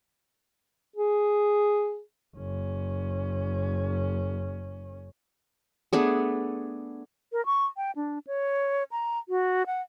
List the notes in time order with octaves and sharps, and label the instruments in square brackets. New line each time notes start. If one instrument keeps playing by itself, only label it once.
[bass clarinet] G#4
[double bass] F#1 C#4
[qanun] A3 B3 D4 G#4
[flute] A#4
C#6
G5
D4
C#5
A#5
F#4
F#5